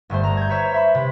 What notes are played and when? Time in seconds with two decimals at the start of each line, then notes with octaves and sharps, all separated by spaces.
0.10 G1 G2 A3 C5
0.24 A#5
0.37 G6 G#6
0.49 B4 C#5 E5
0.74 E5 B5
0.95 C3